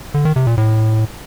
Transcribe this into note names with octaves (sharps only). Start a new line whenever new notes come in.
D3
D#3
C3
A#2
A2